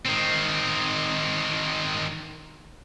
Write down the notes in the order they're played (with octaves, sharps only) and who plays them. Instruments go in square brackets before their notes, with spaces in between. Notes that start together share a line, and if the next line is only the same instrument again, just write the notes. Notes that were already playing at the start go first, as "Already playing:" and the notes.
[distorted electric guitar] D#3 C4